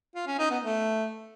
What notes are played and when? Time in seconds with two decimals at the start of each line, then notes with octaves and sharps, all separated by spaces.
0.15 F4
0.27 C#4
0.39 D#4
0.50 B3
0.62 A3